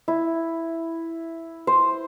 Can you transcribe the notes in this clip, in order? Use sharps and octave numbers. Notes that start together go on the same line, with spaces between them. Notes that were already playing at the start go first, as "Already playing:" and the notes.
E4
C5